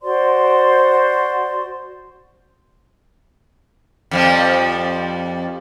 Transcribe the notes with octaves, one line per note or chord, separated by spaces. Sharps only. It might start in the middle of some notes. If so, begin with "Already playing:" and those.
F#4 C5 D5 C6
F2 F3 G3